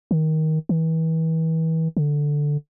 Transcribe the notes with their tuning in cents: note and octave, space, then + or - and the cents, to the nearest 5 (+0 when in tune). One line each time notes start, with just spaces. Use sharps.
D#3 +15
E3 -35
D3 +0